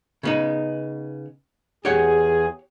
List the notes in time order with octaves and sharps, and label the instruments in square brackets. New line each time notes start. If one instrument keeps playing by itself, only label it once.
[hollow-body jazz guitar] C#3 B3 D#4
[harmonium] E2 G#4 [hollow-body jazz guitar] G4 C#5 F#5